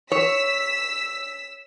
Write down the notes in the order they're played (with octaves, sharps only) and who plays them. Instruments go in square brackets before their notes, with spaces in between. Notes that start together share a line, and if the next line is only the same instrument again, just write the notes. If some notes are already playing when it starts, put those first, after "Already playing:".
[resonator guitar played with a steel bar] C#5 [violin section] E6 B6